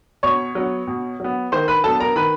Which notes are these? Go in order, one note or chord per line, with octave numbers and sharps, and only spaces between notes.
B2 C#5 C#6
F#3 B3
B2
F#3 B3
D#3 C5 C6
B4 B5
F#3 B3 A4 A5
A#4 A#5
D#3 B4 B5